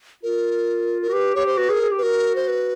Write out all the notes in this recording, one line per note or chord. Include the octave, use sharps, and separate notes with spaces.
F4 A#4
A#4
F#4
G4 B4
G4 C#5
C5
F#4 B4
G#4
A#4
G#4
G4
B4
F#4 A#4
C5
B4